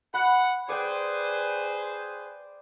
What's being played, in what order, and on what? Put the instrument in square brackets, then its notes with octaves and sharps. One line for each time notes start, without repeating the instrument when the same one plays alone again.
[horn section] F#5 [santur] B5
[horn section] G#4 B4 C5 [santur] D5 G5